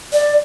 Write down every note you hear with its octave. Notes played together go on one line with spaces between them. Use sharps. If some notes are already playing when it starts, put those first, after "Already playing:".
D5